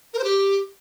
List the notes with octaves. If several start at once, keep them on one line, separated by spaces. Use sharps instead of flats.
A#4
C5
G4